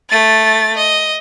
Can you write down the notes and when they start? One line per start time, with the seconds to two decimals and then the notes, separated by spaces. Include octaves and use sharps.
0.10 A3 A6
0.77 D#5